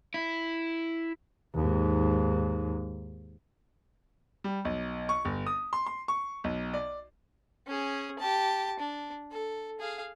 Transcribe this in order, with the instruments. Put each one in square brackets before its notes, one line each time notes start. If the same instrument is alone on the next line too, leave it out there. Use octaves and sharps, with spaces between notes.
[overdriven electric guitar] E4
[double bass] D#2 G#2
[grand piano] G3
B1
C#6
G1
D#6
C6
C6
C#6
B1
D5
[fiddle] C#4 G#4
G4 A5
D4
A4
G#4 F5